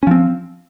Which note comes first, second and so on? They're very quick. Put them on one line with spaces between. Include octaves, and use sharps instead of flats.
C#4 F3 C4